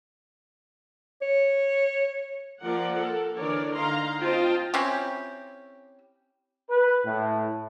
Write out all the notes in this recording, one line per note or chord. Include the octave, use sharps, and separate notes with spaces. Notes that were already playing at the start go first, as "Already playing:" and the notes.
C#5
F3 A#3 A#4 D5 F#5
A4 A#4
D3 E3 D4 A#4 C#5 D5
D3 D#4 F5 A#5 C6
C4 F4 C5 D#5 G5 A5
C4 C#4 E4 G4
B4
A2